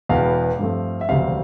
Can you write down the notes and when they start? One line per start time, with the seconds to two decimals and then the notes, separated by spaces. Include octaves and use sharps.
0.09 E1 E2 B2 B3 F5
0.59 G2 F3 A3 C4
1.01 E5
1.09 E1 D2 C3 F3 C4 F5